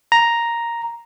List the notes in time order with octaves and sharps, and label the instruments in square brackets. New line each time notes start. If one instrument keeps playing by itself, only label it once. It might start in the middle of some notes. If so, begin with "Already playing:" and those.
[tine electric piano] A#5